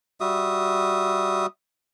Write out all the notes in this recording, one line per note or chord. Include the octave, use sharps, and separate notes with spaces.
G3 F#4 E5 D#6